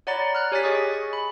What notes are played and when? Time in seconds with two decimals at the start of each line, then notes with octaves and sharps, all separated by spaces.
0.07 C#5 D5 F#5 A#5 B5 A6
0.35 F6 F#6
0.52 G4 C#5 G#5 F#6 A6 B6
0.64 G#4 D#5 G#5 C#6 D#6
0.94 C#6
1.13 B5